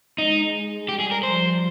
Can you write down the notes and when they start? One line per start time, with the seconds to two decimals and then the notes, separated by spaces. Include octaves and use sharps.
0.18 G#3 D#4
0.88 G3 G4
1.00 G#4
1.11 A#4
1.23 F3 C5